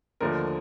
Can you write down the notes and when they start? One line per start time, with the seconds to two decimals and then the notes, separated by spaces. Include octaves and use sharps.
0.20 D#2 D3 F3 A3 A#4